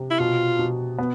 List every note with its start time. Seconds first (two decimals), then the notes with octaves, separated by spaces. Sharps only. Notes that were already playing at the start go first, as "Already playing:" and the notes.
Already playing: C3
0.10 E4
0.19 B2 F4
0.59 B2
0.99 B3